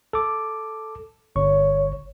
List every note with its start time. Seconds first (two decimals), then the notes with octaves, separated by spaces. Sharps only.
0.13 A4 D6
1.36 G1 C#5 C#6